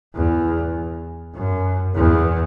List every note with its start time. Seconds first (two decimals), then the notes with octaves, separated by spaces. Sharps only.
0.16 E2
1.36 F#2
1.95 E2